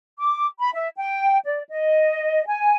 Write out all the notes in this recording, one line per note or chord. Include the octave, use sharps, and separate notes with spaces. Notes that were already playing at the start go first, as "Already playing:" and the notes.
D6
B5
E5
G5
D5
D#5
G#5